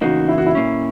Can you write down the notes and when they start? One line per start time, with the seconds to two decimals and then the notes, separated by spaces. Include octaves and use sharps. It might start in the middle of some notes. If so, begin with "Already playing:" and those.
0.01 E2 C#3 A#3 D#4 F#4
0.29 E4
0.38 F#4
0.46 E4
0.55 A#2 A#3 C#4